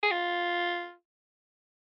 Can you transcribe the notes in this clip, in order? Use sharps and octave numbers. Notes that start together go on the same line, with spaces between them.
G#4
F4